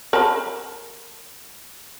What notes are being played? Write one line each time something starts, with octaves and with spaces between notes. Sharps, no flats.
A#4 A5 B5